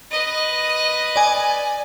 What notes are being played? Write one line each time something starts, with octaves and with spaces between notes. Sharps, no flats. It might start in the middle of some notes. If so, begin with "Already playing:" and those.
B4 D#5
D5 G#5